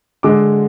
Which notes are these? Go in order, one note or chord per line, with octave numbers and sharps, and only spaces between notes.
D3 G#3 D6